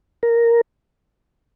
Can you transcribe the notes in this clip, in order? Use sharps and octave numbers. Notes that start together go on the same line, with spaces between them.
A#4